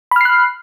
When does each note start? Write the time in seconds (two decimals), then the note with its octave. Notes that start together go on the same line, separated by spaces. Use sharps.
0.11 B5
0.16 F6
0.21 C7
0.25 F#6